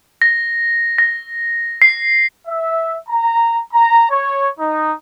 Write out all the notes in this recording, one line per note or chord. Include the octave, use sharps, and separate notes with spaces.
A#6
A#6
C7
E5
A#5
A#5
C#5
D#4